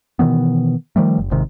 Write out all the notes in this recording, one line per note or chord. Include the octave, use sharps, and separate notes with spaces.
B2 D#3 E3 B3
D#3 F3 G3 A3
F#1
G#1 G#2 C3 D#3